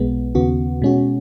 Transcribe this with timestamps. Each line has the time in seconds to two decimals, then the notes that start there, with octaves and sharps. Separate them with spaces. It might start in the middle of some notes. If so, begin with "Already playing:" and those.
Already playing: B1 B2 G#3 B3
0.35 D#2 C#3 B3 F#4
0.82 B2 G#3 C#4 F#4